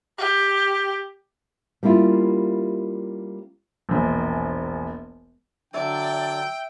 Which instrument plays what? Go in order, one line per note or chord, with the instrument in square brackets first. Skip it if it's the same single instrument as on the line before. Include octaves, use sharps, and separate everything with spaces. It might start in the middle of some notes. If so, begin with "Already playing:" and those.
[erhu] G4
[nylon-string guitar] G3 A#3 C#4 E4 F4
[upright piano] E1 A#1
[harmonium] D3 F#3 D4 [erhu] D5 [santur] E5 E6 [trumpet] G5